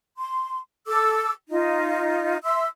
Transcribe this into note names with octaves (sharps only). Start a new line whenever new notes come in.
C6
A4 D6 E6
D#4 F4
E5 C6 E6